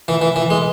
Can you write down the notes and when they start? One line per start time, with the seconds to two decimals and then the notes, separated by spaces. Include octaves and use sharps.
0.08 E3
0.21 E3
0.36 E3
0.50 G#3